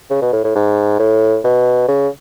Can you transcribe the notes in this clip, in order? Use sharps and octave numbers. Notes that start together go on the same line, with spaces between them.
C#3
B2
A2
A2
G#2
A2
B2
C#3